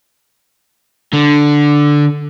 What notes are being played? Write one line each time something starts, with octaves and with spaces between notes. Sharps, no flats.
D3